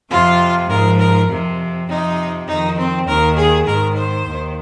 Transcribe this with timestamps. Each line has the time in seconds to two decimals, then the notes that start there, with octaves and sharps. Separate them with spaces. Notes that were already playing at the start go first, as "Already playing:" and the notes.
0.09 F2 C3 F3 F4
0.69 G#2 F3 A#4
0.99 A#4
1.28 F2 C3 F3
1.88 F2 C3 F3 D#4
2.47 F2 D#3 D#4
2.77 C4
3.07 D#2 D#3 A#4
3.36 G#4
3.66 G#2 D#3 A#4
3.96 C5
4.25 D#2 D#3